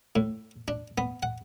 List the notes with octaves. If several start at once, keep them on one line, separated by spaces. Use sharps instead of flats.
A2
D4
B3
F#5